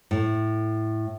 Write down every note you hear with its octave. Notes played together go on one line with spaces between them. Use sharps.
A2